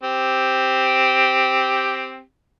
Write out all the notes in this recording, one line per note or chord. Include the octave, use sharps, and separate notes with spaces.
C4 G4